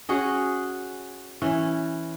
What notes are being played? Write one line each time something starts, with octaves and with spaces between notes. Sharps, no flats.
C#4 F#4 G#4 D#5
E3 C#4